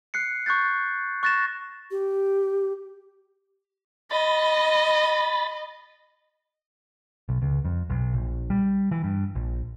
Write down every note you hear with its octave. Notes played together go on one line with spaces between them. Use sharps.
F#6 C7 C#7
C#6 F#6 G6 A6
C#6 F#6 A6 A#6 E7
G4
D#5 B5 A6
B1
C#2
F2
B1
A#1
G3
E3
G2
A#1